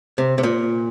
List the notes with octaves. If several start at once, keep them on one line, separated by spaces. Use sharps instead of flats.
C3
C3
A#2